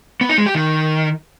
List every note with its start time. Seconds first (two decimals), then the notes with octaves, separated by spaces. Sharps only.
0.21 B3
0.29 D#4
0.38 G#3
0.46 G4
0.55 D#3